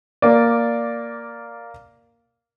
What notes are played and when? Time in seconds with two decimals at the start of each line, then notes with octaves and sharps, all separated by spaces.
0.22 A#3 D5